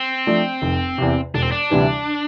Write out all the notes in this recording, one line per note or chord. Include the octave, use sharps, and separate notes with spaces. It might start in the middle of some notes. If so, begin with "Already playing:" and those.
Already playing: C4
F3 A3 D4
F1
E2 C3
E1 D4
C4
D4
D2 C3 E3 G3